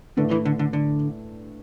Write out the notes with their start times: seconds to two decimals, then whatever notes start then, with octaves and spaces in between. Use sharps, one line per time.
0.17 A2 D3 A3 D4 B4
0.31 E3
0.45 D3
0.59 D3
0.73 D3